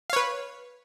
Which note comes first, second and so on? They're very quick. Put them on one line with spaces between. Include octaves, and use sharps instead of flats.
F5 C#5 B4